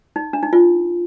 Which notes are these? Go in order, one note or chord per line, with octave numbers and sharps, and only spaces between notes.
D#4
D4
D#4
F4